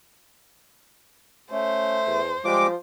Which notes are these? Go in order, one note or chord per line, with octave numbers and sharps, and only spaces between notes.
A3 C#4 C5
E2
F3 G3 G#3 D6